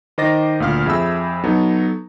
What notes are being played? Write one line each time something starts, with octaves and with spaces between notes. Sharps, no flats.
D#3 C5 D#5 D6 A6 A#6
D2 A#2 F5 F6
F2 G#4 E5 B5 E6
F#3 B3 D#4 A4